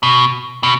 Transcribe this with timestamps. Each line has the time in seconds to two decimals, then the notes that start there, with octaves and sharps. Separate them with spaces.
0.03 B2
0.63 B2